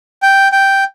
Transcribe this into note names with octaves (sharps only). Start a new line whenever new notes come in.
G5
G5